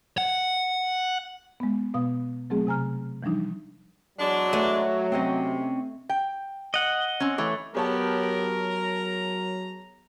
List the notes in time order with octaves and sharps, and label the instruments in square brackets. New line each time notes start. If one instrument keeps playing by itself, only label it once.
[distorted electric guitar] F#5
[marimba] G#3 B3
B2 B3 F5 D#6
F#3 A3 C4 G#4
C3 G#5 A#5 F6
E3 F3 G3 D4 D#4
[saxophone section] E2 G#3 D4 [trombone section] F#3
[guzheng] A3 [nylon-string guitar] G#5
[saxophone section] C3 [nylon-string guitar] C4 C#4 D#5
[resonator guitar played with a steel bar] G5
[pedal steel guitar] D#5 F#5
[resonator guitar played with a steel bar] C4 C#4
E3 A3 C#5
[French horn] F#3 [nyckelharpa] B3 G4 [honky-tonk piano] G#4 C#5 A5 [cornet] A#4
[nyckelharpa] A#5